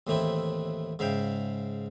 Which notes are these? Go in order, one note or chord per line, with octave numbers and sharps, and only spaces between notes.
D#2 A2 E3 A3 C4 E4
G#2 C#3 E5 F5 G5